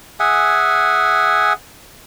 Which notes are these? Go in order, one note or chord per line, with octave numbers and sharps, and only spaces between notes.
G#4 E5 F#5 G#5